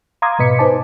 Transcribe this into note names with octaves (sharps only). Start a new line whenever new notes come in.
F5 A#5 C6 D6 D#6 G#6
G#2 B2 B4 D#5 B6 C#7
D#4 B4 C5 G#5 A5 D6